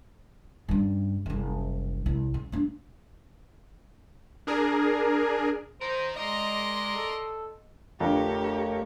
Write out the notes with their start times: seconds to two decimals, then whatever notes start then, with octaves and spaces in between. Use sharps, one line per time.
0.69 G2 C#3
1.26 F#1 C2
2.06 C2
2.34 C#3
2.52 A#3 D4
4.47 D4 G#4 A#4
5.81 D#4 A#4 C5
6.16 G#3 A#4 D5 D#5 C6
6.96 A4
8.00 F2 D3 A3 G4 A#4 C#5